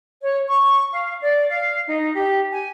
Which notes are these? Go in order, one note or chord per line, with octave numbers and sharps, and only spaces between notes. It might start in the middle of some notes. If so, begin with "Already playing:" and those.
C#5
C#6
F5
D5
F5
D#4
G4
G#5